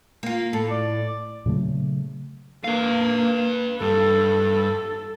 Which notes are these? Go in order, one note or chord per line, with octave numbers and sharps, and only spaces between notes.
A#3 F4
A2 A4
D5
A#2 C#3 F#3 A3
A#3 B4 F5
G2 A4